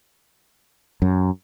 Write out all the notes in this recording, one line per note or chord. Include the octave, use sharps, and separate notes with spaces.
F#2